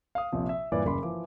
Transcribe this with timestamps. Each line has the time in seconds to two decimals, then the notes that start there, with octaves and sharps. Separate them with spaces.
0.15 F5 D#6
0.32 A#1 C3 F3
0.49 E5
0.72 G2 A#2 E3 D5 D6
0.85 F#1 C#3 B5 C6 D6
1.03 E3 F3 D6